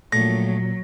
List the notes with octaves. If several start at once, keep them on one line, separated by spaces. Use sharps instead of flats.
A#1 A#2 F#3 A3 A#6